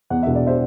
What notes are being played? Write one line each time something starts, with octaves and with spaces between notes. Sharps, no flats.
E2 F#5
E1 E5
D5
C5 E5